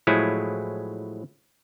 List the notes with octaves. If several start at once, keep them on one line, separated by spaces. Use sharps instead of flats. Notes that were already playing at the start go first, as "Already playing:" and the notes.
A2 F3 F#3 G#3 E4 G#4